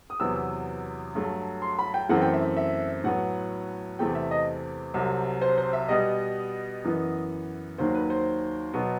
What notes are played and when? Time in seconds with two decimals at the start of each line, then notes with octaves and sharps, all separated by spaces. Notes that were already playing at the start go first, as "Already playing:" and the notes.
0.10 D#6
0.20 E2 C3 F#3 B3 E6
0.36 E6
1.15 G2 F#3 A3
1.62 C6
1.79 B5
1.94 G5
2.09 F#2 E3 A3 C4 F#5
2.22 G5
2.33 E5
2.57 E5
3.04 A2 F#3 B3 F#5
3.99 E2 C3 E3 A3 C4 G5
4.15 E5
4.31 D#5
4.94 C2 C3 F#3
5.41 C5
5.58 C5
5.73 E5
5.88 B2 G3 B3 D#5
6.84 F#2 E3 B3
7.78 D#2 D#3 F#3 C5
7.94 B4
8.10 C5
8.73 B2 F#3 B3